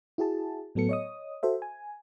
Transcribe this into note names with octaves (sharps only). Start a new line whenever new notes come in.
E4 F#4 G#4 A5
A2 F#3 B3 A4 C#7
C#5 D#5 D#6
F#4 A4 C5 E5
G#5